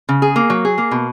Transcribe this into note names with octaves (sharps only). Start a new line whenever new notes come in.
C#3
G#4
A#3
F#3
G#4
A#3
B2